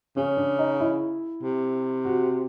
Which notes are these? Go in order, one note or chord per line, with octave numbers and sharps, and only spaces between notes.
C#3 C#4
D4
D#4
E4
C3
F#4